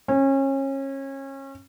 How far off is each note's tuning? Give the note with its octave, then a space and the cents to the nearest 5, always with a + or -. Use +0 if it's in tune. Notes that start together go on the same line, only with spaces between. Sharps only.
C#4 -30